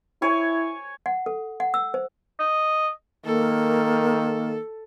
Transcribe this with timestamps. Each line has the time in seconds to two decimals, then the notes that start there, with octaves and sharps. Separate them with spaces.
0.22 E4 C#5 G#5
1.06 F#5
1.26 A4
1.60 F#5
1.74 E6
1.94 C5
2.39 D#5
3.25 D#3 A#3 A4